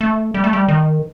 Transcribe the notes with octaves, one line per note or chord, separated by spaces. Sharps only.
A3
G3
A3
G3
D#3